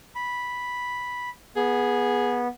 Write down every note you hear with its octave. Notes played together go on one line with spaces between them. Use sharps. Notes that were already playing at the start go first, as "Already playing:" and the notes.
B5
B3 G#4